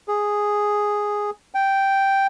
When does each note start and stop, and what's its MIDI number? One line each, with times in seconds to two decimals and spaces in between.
0.08 1.30 68
1.55 2.27 79